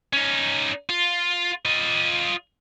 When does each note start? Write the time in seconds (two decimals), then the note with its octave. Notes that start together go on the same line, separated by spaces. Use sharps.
0.13 C#4 D#4
0.90 F4
1.65 F4 D#5